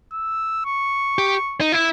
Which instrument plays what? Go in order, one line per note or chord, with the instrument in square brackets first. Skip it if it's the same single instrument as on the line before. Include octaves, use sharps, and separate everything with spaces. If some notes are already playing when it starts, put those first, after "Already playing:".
[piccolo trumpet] E6
C#6
[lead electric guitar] G4
D#4
E4